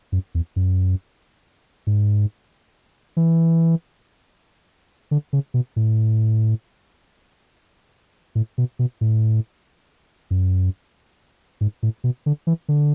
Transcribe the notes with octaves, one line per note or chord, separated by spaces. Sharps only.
F#2
E2
F#2
G#2
E3
D3
C#3
B2
A2
A2
B2
B2
A2
F#2
G#2
A2
B2
D3
E3
D3